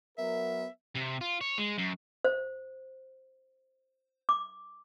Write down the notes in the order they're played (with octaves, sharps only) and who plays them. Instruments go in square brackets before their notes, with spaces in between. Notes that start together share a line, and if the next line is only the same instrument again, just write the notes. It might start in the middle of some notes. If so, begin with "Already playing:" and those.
[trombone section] F#3 B3 A#4 [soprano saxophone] E5
[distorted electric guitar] C3
F4
C#5
G#3
F#2
[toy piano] C5
D6